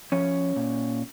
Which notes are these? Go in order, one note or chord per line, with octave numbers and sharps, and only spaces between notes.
F3 C#4 C#5
A#2